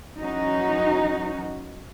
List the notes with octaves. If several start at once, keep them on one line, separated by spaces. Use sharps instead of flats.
F#2 E3 C#4 D#4 F#4